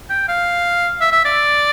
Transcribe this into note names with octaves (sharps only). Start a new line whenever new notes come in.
G5
F5
E5
E5
D5